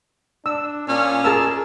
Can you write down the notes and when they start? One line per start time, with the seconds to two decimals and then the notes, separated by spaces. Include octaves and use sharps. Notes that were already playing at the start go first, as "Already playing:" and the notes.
0.46 D4 E6
0.88 A#2 C#4
1.24 G#4 A#4 A5 E6